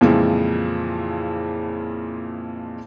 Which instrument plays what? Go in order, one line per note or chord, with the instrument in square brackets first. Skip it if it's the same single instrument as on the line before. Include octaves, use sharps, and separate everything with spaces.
[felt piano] F2 A#2 C#3 E3 F3 G#3